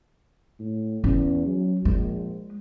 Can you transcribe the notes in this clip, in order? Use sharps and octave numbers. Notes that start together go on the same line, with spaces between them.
A2
E2 C#4
F#3
A#1 G#3